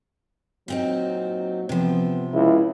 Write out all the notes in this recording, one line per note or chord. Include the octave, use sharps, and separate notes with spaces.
A#2 F#3 C4 D#4
C3 F3 B3
C#2 E4